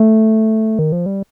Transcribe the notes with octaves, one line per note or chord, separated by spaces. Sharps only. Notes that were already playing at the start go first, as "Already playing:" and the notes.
Already playing: A3
D#3
F3
G3